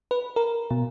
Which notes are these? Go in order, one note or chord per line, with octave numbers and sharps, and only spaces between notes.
B4
A#4
B2